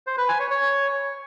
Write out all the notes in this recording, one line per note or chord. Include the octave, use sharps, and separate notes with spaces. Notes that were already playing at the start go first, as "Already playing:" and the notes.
C5
B4
G#5
C#5
C#5